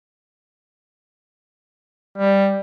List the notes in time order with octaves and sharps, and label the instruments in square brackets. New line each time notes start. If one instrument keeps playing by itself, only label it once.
[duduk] G3